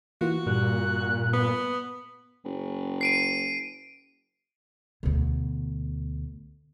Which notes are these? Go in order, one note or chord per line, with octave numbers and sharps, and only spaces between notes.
E3 A#3 F4 F#4
G2 A#2 G3 F#6
B3
F#1
C7 D7 D#7
D2 B2